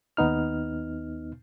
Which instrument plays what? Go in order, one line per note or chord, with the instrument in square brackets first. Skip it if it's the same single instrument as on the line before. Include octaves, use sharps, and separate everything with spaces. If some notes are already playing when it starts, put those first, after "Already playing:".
[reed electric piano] D#2 B3 D#4 F6